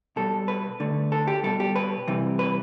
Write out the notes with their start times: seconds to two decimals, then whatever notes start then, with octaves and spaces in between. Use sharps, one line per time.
0.16 B2 G3 A4
0.48 B4
0.80 D3 A3
1.12 A4
1.27 G4
1.43 B2 G3 A4
1.60 G4
1.76 B4
2.08 C3 E3 G3
2.39 B4